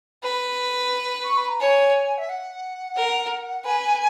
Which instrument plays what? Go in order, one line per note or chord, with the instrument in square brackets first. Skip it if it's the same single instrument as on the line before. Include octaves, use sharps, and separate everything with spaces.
[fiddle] B4
[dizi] C#6
B5
A#5
[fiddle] C#5 [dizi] G#5
[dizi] E5
F#5
[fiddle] A#4
[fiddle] B4 [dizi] G#5